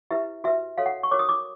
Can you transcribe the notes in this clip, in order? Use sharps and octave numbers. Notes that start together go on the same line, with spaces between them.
E4 G4 B4 E5
F#4 B4 E5
F#4 A4 C#5 F5
F#5
C#6
F#4 A#4 C#5 D6
D#6
D6